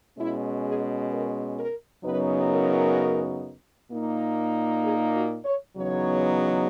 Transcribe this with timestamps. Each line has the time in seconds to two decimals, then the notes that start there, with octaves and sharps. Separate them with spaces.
0.19 B2 G#3 C#4 E4
0.65 G#4
1.12 A#4
1.58 A#4
2.04 F#2 C#3 F#3 B3 D#4 B4
2.51 A#4
3.90 A#2 A#3 D#4
4.83 G#4
5.14 F#4
5.45 C#5
5.76 E2 C#3 F#3 B3 D#4 C#5